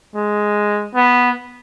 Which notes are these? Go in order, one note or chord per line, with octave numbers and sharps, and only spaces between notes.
G#3
B3